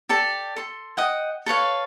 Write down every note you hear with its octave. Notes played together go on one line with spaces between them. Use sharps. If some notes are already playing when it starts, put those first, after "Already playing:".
G4 A4 D5 A5
A4 C6
D#5 F#5 G5
A4 B4 C#5 F5